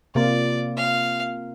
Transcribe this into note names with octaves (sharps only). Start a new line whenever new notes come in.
C3 A#3 F4 D5
F5